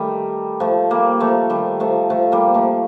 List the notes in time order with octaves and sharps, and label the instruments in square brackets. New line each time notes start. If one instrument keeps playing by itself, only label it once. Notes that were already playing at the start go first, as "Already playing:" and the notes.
Already playing: [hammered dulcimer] D#3 G3 A3
F3 A3
G3 A#3
F3 A3
D#3 G3
F3 A3
F3 A3
G3 A#3
F3 A3